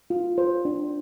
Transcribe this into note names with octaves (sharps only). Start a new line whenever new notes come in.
F4
C5
D4